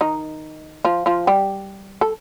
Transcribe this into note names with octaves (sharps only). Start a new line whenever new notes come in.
D#3 D#4
F3 F4
F3 F4
G3 G4
A4